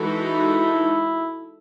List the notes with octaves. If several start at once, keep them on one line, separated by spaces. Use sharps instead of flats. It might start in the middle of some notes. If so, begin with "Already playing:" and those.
Already playing: E3 G#3 D#4 F#4 A4
E4